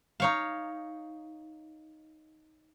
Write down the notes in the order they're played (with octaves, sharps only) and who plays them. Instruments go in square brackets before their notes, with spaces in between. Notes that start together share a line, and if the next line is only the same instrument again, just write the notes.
[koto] D#4 C#5 F5